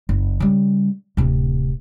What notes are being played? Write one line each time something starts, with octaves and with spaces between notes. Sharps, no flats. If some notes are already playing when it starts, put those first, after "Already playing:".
F#1
C#3 G3
D1 C3